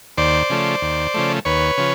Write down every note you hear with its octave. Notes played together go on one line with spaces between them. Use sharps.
D#2 C5 D5
C#3 F3 A3
D#2
C#3 F3 A3
D#2 B4 C#5
C#3 F3